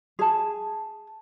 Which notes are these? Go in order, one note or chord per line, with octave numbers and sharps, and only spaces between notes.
G#4 A5